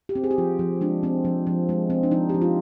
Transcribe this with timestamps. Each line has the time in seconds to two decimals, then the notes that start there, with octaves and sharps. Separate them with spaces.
0.09 G4
0.15 C4
0.24 G#4
0.31 G4
0.38 F3 F4
0.59 F3
0.81 G#3 D4
1.03 C4
1.25 F3
1.47 F3
1.69 G#3
1.90 C4
2.03 D4
2.11 F3 D#4
2.29 F3 G4
2.42 F4